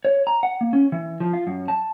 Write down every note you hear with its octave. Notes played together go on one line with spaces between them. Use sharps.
C#5
A#5
F#5
A#3
C#4
E3
F3
F4
F#2
A5